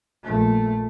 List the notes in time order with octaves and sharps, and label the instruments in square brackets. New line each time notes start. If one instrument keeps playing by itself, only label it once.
[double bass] A#1 A3